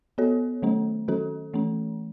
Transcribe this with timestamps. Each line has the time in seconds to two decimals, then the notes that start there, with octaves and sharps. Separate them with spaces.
0.18 B3 F#4 A4 C#5
0.62 D#3 F#3 A3 C#4
1.08 D#3 F#3 C#4 F#4 A4
1.54 E3 A3 C#4